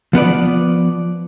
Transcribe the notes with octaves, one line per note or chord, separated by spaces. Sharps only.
F3 B3 B4 D5